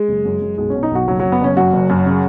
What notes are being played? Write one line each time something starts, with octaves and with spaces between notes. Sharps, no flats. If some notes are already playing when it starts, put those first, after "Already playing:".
Already playing: G#3
F#1
F#2
F#2
B1 G#3
B2 C#4
D#4
B1 F#4
F#1 F#3
F#2 F#3
B3
F#1 C#4
F#2 F#4
F#1
F#2
C#3